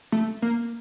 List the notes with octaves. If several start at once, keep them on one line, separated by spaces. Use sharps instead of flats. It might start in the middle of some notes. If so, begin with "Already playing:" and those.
A3
A#3